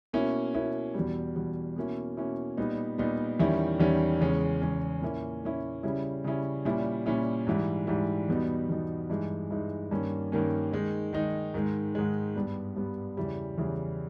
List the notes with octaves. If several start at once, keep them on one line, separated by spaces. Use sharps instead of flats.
B2 A#3 C#4 E4
B2 A#3 C#4 E4
E2 B2 G3
E2 B2 G3
B2 A#3 C#4 E4
B2 A#3 C#4 E4
A#2 G3 B3 D#4
A#2 G3 B3 D#4
E2 D#3 G3 C#4 E4
E2 D#3 G3 C#4 E4
E2 C#3 G#3 C#4
E2 C#3 G#3 C#4
A#2 A#3 C#4 E4
A#2 A#3 C#4 E4
C#3 G3 C#4 E4
C#3 G3 C#4 E4
A#2 G3 C#4 E4
A#2 G3 C#4 E4
G#2 E3 G3
G#2 E3 G3
E2 B2 G3 B3 D#4
E2 B2 G3 B3 D#4
G2 E3 G#3 D#4
G2 E3 G#3 D#4
G2 D#3 A#3 C#4
G2 D#3 A#3 C#4
D#3 G#3 D#4
D#3 G#3 D#4
G#2 D#3 G#3
G#2 D#3 G#3
G2 G3 B3
G2 G3 B3
E2 C#3 E3 G3
E2 C#3 E3 G3